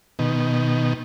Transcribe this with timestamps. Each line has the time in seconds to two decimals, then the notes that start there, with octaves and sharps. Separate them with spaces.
0.19 B2 D#3